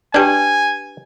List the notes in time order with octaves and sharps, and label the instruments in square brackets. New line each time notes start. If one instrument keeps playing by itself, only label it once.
[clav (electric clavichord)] D4 G5 [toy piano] G4 B4 D5 [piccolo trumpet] G#5